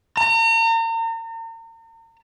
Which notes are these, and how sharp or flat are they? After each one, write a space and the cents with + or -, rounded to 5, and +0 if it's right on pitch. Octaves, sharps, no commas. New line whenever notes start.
A#5 -40